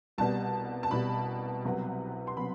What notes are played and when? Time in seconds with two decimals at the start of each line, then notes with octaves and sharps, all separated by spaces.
0.18 C2 B2 G3 B3 A5
0.83 A5
0.91 C2 B2 G3 B3 B5
1.65 C2 C3 F#3 B3
2.27 C6
2.37 C3 F#3 B3 B5